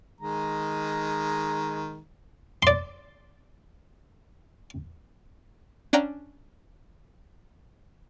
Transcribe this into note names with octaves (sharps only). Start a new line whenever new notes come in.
D#3 G#3 A#5
D5 C6
C#4 D4 D5 F5 G5 A#5